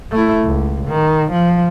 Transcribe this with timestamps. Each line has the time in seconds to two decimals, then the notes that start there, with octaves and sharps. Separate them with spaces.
0.12 A3 E4
0.45 C#2
0.88 D#3
1.32 F3